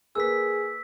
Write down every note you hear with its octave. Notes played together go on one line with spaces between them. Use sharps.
A#3 G#4 B4 E6 B6